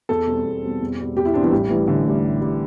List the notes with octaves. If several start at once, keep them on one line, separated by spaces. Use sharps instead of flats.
E2 A4
B2 G3 C4
E2
B2 G3 C4
E2
B2 G3 C4
E2 G4
E4
B2 G3 C4 D4
E3
A1 G3
A2 E3 G3
A1 D3
A2 G3
A1
A2 G3